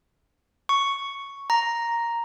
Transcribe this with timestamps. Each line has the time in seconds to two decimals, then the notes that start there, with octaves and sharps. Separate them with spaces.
0.69 C#6
1.50 A#5